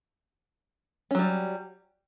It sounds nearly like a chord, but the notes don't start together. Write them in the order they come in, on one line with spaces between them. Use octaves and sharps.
C#4 F#3 G3